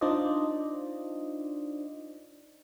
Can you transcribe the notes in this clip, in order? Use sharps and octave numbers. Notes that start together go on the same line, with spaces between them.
D4 D#4 F4 C5 D5 D#5